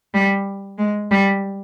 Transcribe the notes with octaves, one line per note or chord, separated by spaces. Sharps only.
G3
G#3
G3